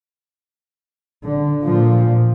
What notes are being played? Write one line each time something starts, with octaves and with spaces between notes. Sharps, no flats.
D3
A#2 F3